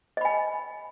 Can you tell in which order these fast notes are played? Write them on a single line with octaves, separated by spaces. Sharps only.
D#5 B5 G#5